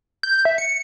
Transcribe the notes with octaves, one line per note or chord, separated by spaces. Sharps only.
G6
E5
C#7